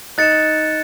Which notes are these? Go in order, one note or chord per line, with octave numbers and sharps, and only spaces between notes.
D#4 F#6 A6 C#7 E7